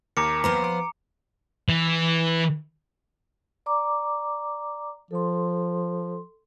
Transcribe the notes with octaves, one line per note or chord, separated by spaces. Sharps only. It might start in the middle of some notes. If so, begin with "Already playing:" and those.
D#2 A#3 A#4 A#5 D6 C#7
F3 B3 C5 A#5
D6
E3
D5 A#5 D6
F3 A4 C6